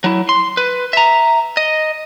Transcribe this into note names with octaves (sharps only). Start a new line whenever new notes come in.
F#3 E4
C6
B4
E5 A#5
D#5